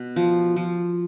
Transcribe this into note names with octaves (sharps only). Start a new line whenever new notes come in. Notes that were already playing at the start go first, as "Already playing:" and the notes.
Already playing: B2
F3
F3